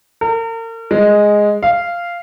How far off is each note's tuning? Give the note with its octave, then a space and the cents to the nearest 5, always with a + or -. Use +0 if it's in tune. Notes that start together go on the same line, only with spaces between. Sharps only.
A#4 -40
G#3 +0
F5 -10